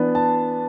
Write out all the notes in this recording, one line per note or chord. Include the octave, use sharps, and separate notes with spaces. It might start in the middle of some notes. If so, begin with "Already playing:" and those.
Already playing: E3 B3 D4
A5